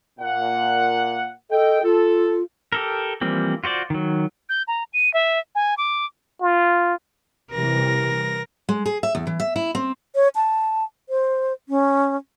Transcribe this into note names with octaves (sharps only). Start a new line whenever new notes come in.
A#2 F#5
A4 D#5 G5
F4 A4
G4 A4 A#4
E3 F3 G3 A#3 C4
F4 F#4 C5 D5
D#3 F#3
G6
A#5
D#7
E5
G#5
D6
F4
C3 E3 G3 A#4 A#6
G#3
G#4
E5
E2
E3
E5
E4
C4
C#5
A5
C5
C#4